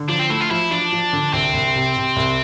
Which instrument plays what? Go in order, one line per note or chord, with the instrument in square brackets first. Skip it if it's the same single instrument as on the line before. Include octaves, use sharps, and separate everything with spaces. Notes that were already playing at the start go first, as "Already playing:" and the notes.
Already playing: [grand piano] D3
[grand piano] F3 [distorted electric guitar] D4
[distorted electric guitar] C4
[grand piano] A3 [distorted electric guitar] E4
[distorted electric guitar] F4
[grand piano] F3 [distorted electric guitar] E4
[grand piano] F3 [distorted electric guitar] D4
[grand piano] F3
D3
[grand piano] C2 [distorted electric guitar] C4
[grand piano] C2
C3
C3
C2